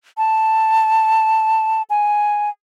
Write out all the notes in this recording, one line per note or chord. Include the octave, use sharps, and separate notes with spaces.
A5
G#5